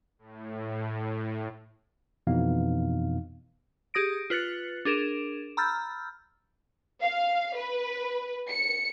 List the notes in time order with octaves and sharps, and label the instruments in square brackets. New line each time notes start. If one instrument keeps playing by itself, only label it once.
[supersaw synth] A2
[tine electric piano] F2 B2 E3 B3 D#4 F5
[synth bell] G4 G#4 D#6 A#6 D7
F4 B4 F#6 A6 C#7
D4 G#4 A#4 D7 E7
A#5 B5 E6 F6 G6 A6
[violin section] F5
B4
C#7